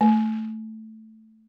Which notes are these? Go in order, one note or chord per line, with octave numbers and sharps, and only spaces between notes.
A3